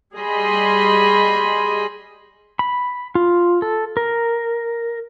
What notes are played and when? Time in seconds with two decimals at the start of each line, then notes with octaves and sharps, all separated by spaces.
0.15 G3 G#4 D#5 B5 C6
2.59 B5
3.15 F4
3.62 A4
3.97 A#4